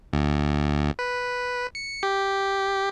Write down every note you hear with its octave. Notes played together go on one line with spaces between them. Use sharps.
D2
B4
C#7
G4